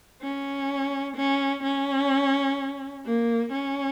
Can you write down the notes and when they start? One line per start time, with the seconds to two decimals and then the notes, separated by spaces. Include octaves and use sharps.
0.22 C#4
1.16 C#4
1.63 C#4
3.06 A#3
3.53 C#4